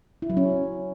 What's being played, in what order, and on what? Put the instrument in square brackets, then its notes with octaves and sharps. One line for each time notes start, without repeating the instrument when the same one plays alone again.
[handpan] E4
F#3
C#4